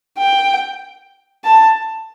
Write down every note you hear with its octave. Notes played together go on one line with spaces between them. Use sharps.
G5
A5